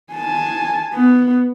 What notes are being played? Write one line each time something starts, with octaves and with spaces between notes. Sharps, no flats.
G#5 A5
B3